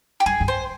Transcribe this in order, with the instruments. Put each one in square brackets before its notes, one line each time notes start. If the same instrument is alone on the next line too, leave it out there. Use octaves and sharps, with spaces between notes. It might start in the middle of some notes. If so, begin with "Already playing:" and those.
[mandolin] G4
[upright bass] G2 [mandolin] G#4
[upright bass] G2
[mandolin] C5